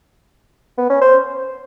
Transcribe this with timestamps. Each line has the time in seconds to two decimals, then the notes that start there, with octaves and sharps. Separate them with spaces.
0.78 B3
0.90 C#4
1.01 C5